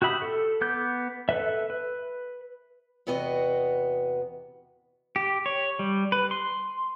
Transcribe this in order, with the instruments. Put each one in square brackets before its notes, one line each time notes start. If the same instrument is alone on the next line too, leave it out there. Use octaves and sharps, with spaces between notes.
[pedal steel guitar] F#4 G4 E5 B5 D#6
A4
B3 D6 G6
A4 B4 E5
B4
[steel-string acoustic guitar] E2 C3 B3 F#4 D#5
[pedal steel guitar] G4
C#5
G3
B4
C6